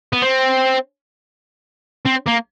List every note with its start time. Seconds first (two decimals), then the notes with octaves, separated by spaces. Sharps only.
0.13 B3
0.22 C4
2.06 C4
2.28 A#3